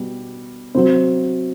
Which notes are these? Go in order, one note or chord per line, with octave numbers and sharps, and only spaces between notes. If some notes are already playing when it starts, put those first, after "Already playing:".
Already playing: B2 G3
C3 F#3 C5